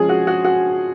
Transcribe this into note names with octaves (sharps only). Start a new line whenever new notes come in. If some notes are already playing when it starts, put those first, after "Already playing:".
Already playing: F3 G#3 C#4 G#4
F#4
F#4
F#4